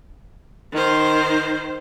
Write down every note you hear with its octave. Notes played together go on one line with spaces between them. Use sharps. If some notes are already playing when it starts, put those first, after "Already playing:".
D#3 C5